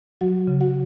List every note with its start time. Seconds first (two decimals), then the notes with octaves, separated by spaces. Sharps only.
0.21 F#3 F#4 F#5
0.47 C#3
0.60 F#4 F#5